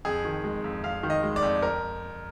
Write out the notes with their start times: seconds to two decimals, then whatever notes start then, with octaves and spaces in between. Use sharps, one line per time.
0.05 F2 G#4
0.25 D#3
0.44 G#3
0.64 F2
0.84 F2 F5
1.03 D#3
1.10 D#5
1.23 G#3
1.36 D5
1.42 F2
1.62 A#4